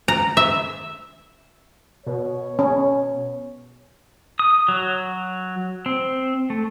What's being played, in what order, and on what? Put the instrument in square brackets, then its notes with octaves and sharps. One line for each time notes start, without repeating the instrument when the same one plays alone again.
[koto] A#5
E5
[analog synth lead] B2 [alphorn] C#5
[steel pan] C#4
[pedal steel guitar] D#6
F#3
C4
A3